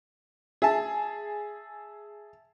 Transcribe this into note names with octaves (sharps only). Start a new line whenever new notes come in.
G#4 E5 A5